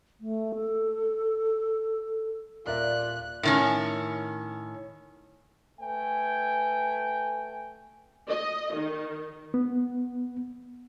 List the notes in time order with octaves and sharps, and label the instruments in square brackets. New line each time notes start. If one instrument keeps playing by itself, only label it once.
[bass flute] A3
A4
[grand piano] D#1 A#4 E5 [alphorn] F4 [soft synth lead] D5 [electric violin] F#6
[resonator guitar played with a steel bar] A2 D#3 C#4
[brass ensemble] A3 B4 G5 G#5
[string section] D#5
D#3
[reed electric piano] B3